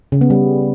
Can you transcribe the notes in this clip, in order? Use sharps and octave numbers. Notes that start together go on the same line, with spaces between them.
C#3
B3
G3